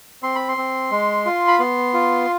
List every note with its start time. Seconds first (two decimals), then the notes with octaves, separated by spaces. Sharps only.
0.23 C4 C6
0.35 B5
0.48 C6
0.57 C4
0.91 G#3
1.25 F4
1.48 B5
1.59 B3 C6
1.94 F4